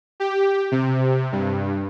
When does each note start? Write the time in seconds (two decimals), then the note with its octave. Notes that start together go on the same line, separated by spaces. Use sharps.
0.20 G4
0.72 C3
1.32 G2